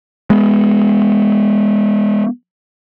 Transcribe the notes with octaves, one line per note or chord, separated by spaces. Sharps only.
G#3 B3